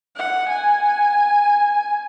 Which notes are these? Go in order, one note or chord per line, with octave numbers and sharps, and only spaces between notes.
F#5
G#5